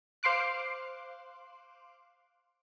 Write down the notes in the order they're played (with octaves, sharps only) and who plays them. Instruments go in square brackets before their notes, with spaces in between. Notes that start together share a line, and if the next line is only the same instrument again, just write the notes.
[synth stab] C5 F5 C6 D6 F#6